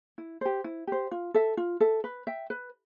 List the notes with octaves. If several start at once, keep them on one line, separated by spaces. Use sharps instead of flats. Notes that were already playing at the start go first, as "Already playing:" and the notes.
E4
G4 C5
E4
G4 C5
F4
A4 E5
F4
A4 E5
B4
E5 G5
B4